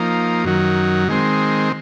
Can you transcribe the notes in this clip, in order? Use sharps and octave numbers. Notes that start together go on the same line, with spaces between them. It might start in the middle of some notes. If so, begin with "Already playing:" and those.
Already playing: F3 A#3 D#4
F#2 D#3 F#3
D#3 G#3 C4